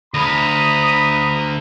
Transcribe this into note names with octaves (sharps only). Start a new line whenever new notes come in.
D2 A#5 B5 D#6